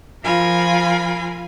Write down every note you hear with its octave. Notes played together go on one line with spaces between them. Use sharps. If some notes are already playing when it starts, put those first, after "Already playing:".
F3 F4 A#4 G#5 B5